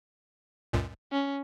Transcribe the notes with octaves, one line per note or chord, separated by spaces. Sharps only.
C#2 F#2 A#2
C#4